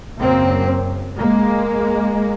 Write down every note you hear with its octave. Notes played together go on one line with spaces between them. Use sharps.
F#2 C#3 A#3 C4
G#3 A#3